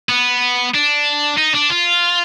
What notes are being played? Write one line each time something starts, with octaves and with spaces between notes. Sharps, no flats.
B3
D4
D#4
D4
F4